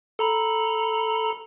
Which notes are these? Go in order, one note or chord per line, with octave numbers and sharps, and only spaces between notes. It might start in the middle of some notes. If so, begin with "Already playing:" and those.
A4 A#5 B5